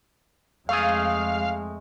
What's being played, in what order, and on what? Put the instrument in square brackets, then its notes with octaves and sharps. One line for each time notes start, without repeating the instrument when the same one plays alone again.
[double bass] F2 G#3 [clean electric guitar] A3 G#4 [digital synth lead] F5